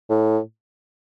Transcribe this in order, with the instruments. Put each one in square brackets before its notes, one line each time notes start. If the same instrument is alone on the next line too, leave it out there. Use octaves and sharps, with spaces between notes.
[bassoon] A2